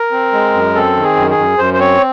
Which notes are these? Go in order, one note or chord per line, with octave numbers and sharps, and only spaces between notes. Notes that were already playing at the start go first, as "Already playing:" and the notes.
Already playing: A#4
C4
G#3
F#2
C4 A4
D#3
G#4
F#2
G#4
F#2
F#2 C5
C5
C4 C#5